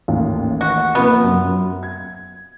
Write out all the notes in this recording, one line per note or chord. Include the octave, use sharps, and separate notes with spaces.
A1 D#2
F#4
C3 F3 A#3 B3
F#2
G#6